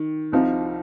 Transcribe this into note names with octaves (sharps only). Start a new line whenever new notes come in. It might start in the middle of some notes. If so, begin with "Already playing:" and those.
Already playing: D#3
C2 C3 F3 D#4